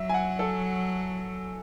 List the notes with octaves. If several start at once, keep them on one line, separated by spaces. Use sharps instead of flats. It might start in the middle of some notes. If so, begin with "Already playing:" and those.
Already playing: F#3 E5
G#5
F#5
A4